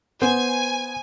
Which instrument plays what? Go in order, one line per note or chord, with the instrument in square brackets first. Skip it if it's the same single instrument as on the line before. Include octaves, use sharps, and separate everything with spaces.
[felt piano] B3 [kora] C5 [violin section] G#5